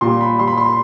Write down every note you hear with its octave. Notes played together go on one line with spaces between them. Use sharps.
A#2 G3 C6
B5
A#2 G3 C6
B5
C6
B5